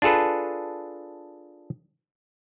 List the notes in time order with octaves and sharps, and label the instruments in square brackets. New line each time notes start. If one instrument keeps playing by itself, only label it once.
[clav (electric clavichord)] D4 F4 G#4 A4 B4